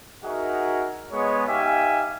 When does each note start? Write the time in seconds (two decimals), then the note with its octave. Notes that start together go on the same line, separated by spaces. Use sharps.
0.24 D#4 F#4 G#4 A#4 E5 F#5
1.12 G#3 B3 C#5
1.48 D#4 G4 E5 F5 G#5